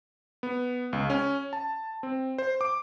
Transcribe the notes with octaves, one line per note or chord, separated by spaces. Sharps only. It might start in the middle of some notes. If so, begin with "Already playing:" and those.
B3
C#2
C#4
A5
C4
C5
D6